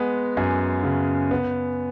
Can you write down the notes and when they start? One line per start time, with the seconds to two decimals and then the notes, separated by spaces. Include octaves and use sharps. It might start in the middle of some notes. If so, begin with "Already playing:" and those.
Already playing: G#3 B3
0.37 F#2 G#5
0.83 C#3
1.31 B3